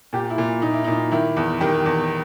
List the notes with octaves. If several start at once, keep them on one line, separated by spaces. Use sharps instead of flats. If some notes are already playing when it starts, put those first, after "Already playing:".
A#2 G4
E4
A#2
A#2 D#4
E4
D#4
A#2
D#3 E4
E2
D#3 G4
E2